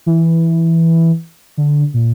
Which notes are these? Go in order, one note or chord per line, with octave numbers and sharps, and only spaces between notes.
E3
D3
A#2